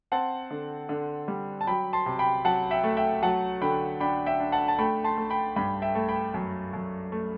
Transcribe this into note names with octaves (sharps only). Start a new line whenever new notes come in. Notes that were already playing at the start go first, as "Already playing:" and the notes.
C4 F#5 A5
D3
D3
G3
A5
F#3 G5 B5
A5 C6
C3
G5 B5
F#3 F#5 A5
E5 G5
A3
E5 G5
F#3 F#5 A5
D3 G5 B5
D4 G5 B5
E5 G5
D4
F#5 A5
A5
A3 G5 B5
A5 C6
A3
G5 B5
G2 G5 B5
E5 G5
A3
G5 B5
F#2
F#2
A3